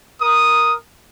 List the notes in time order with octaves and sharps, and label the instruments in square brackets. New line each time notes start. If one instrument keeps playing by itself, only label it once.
[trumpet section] A#4 D#6